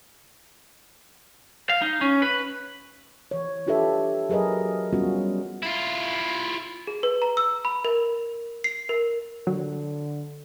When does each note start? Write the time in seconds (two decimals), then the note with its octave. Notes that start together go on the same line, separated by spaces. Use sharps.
1.69 F5
1.82 D#4
2.01 C#4
2.22 B4
3.31 E3 C#5
3.67 D4 F4 G4 A4 B4 E5
4.29 F#3 G#4 A#4 B4 D#5
4.93 F#3 G3 B3 C#4 F4 F#4
5.63 E4 F4
6.87 G#4
7.03 B4
7.22 A#5
7.37 E6
7.65 B5
7.85 A#4
8.64 C7
8.89 A#4
9.47 D3 F#3